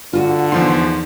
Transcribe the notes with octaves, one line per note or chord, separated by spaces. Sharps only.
D3 F4 F#4
E2 F3 D#4 C6